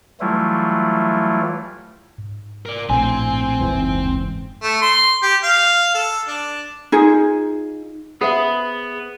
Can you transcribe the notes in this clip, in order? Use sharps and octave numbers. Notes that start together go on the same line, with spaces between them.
E3 F#3 G3 A3 E4 F4
G#2
A#4 D5
A#1 A2 C4 C5 G#5
F#1 D2 G#2 E3
A3
C6
G4
F5
A4
D4
D#4 F4 G#4
B3 G#4 C5 E5